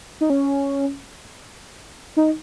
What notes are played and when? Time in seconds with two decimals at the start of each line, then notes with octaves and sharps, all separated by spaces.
0.21 D#4
0.30 C#4
2.17 D#4